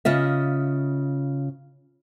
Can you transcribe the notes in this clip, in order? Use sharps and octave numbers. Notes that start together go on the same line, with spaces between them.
C#3 F4 D#5 E5